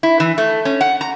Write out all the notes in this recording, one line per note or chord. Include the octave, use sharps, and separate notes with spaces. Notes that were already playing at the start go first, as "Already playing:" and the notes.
E4
E3
A3
C#4
F#5
A#5